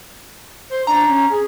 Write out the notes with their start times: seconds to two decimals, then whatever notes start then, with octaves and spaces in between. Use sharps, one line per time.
0.70 C5
0.87 D4 A#5
1.08 C#4
1.30 G#4